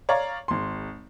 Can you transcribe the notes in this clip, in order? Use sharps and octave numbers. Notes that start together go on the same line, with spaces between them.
C#5 D5 F5 A#5
G#1 C6